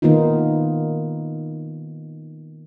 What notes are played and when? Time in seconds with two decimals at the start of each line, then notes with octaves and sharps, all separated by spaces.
0.02 D#3 A#3 B3 D#4 F4